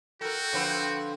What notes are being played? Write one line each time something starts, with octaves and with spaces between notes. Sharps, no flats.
F#4 A4 A#4 G5
D3 F3 C4 B4